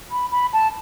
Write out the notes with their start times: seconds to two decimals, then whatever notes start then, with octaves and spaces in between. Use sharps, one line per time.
0.11 B5
0.32 B5
0.53 A5